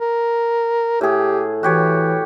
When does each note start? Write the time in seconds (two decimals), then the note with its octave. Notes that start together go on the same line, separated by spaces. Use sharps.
0.01 A#4
1.01 A2 G4 G#4
1.63 E3 F#4 G4 C#5